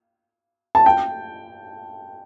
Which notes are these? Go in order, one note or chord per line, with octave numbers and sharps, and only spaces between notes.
A5
G5